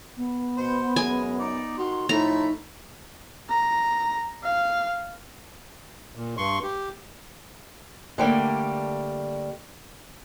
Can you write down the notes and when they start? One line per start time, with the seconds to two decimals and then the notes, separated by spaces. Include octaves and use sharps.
0.17 B3
0.57 B2 C5 F#5
0.96 F#2 G#3 G#5
1.39 D#4 D5
1.78 D#3 F#4 C6
2.09 A2 F3 A3 D#4 E4 A#5
3.49 A#5
4.43 F5
6.15 A#2
6.37 G2 C6 C#6
6.63 G4
8.18 D3 G3 A3 A#3